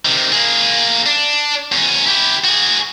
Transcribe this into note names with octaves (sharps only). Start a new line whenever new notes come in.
C3 D#3
A#3 G#4
D4
E2 C#4
E4 G4
F#4 G#4